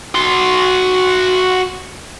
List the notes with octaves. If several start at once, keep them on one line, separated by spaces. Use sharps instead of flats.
F#4 C6